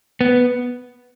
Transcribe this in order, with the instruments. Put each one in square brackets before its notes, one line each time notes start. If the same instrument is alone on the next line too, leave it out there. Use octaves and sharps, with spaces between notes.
[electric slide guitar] B3